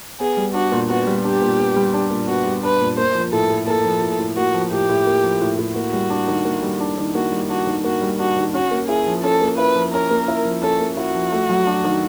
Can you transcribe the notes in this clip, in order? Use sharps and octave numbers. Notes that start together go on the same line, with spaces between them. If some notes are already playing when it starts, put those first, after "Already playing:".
B3 G#4
G3
D4 F#4
A#2
B3 F#4
G3
D4 G4
A#2
B3
G3
D4
A#2
B3 F#4
G3
D4 B4
A#2
A#3 C5
F3
A2 A4
A2
A#3 A4
F3
A2
A2
A#3 F#4
F3
A2 G4
A2
A#3
F3
A2
A2
A#3 F#4
G3
D4
D#3
A#3
G3
D4
D#3
A#3 F#4
G3
D4 F#4
D#3
A#3 F#4
G3
D4 F#4
D#3
C#4 F#4
A#3
E4 G#4
F3
C#4 A4
A#3
E4 B4
F3
C#4 A#4
A#3
E4
F3
C#4 A4
A#3
E4 F#4
F3
A3
F#3
D4
D#3